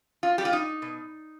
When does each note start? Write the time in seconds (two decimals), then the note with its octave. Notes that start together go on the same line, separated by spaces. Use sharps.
0.23 F4
0.38 G3 G4
0.45 F4
0.53 D#4
0.82 B2